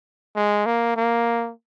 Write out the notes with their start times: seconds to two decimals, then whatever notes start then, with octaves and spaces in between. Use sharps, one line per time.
0.36 G#3
0.66 A#3
0.97 A#3